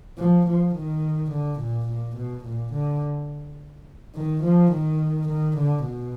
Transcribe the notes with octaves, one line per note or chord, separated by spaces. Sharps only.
F3
F3
D#3
D3
A#2
A#2
B2
A#2
D3
D#3
F3
D#3
D#3
D3
B2